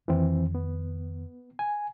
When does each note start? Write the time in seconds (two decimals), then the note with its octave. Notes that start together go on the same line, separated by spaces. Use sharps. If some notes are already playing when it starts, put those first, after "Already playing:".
0.08 F2 D#3 E3 C4
0.55 B3
1.59 G#5